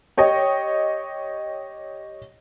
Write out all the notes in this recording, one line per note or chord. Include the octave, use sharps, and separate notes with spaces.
G4 C#5 D#5